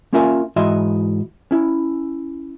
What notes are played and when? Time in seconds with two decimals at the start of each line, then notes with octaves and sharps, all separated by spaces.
0.13 A#3 C#4 F4 A#4 E5 G#5
0.56 G#2 E3 F#4 D#5 E5 C6
1.51 C#4 E4